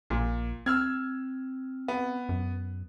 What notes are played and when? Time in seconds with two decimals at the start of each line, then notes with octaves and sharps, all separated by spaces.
0.10 A#1 A#2
0.66 C4 E6 F6 G#6
1.88 B3
2.29 F#2